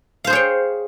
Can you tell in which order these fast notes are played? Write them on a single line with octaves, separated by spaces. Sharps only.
F5 C5 G#4 C#5 G5